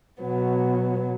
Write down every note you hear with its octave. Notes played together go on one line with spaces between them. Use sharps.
B2 F#3 B3